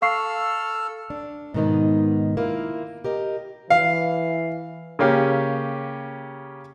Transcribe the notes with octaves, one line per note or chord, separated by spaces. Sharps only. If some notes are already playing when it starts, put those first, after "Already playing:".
A4 F5 C#6 E6 F6 C7
D4
G#2 B2 D#3 B3 D#4
A#3 E4 F4
G4 A#4 D#5
E3 F5
C#3 A#3 C#4 G4